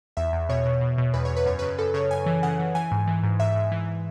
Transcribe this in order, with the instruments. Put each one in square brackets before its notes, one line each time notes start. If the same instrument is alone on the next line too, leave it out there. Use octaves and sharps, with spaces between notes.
[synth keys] E2 E5
E2
B2 C#5
B2
B2
B2
E2 B4
C#5
E2
B4
F#2 C#5
C#3 B4
F#2 A4
C#3 C#5
F#2 G#5
E3
C#3 F#5
E3
E3 G#5
G#2
E3
G#2
G#2 E5
G#2
E3